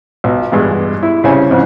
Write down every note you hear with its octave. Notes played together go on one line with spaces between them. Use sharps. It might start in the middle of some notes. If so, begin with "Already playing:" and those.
B1
E2 G2 G#3
E4
C2 C#3 E4 C5 C#5 G#5
F2 G#2 C#3